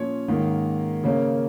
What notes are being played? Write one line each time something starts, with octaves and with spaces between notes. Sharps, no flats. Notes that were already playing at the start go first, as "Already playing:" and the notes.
Already playing: A#2 F3 C#4 C#5
G#2 D#3 A#3
C#3 A#3 C#4